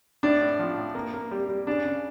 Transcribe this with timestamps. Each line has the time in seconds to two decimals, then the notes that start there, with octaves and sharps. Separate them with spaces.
0.23 A2 D4
0.40 A2
0.59 F3
0.77 A2
0.95 A#3
1.14 A#3
1.31 G3
1.49 G3
1.67 C#3 D4
1.85 C#3